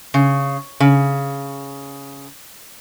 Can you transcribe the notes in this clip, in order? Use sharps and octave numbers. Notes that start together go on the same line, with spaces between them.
C#3
C#3